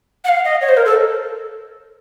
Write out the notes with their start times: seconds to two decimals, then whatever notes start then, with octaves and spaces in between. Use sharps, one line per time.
0.24 F#5
0.29 F5
0.45 D#5
0.61 C#5
0.69 C5
0.77 A#4
0.85 A4